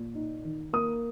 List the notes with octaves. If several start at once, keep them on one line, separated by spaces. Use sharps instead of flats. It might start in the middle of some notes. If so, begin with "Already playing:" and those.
Already playing: A#2
D#4
D#3
A#3 D#6